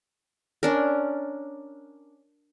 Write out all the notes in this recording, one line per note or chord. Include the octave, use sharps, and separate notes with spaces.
C#4 D4 A#4